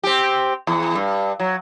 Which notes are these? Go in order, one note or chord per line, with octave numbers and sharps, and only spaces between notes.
C4 G4
E2
G2
F#3